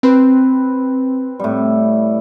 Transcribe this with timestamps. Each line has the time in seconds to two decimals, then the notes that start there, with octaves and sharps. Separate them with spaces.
0.03 C4 B4
1.40 A2 G3